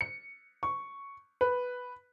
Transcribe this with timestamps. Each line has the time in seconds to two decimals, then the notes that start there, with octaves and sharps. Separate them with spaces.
0.01 C#7
0.63 C#6
1.41 B4